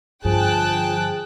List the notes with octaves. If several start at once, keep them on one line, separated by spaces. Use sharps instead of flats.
G2 D3 F3 G#4 G5 A5 F#6